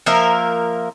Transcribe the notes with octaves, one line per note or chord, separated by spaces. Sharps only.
F3 A#3 A#4 E5